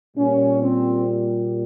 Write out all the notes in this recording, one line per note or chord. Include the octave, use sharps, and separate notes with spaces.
A#2 G3 C#4
C4